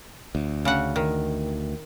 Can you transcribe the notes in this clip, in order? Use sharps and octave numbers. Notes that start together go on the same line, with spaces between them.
D2
C#3 F#5
D#3